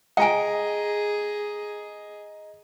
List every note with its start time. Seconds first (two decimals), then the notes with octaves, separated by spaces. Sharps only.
0.17 G#4 D#5 G5 G#5 A#5